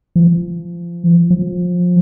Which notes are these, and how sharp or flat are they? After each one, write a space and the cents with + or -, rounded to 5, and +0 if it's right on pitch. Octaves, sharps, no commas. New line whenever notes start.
F3 -25
F3 +25